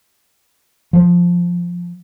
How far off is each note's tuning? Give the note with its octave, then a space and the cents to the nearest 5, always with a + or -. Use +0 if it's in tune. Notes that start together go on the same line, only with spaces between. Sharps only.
F3 +5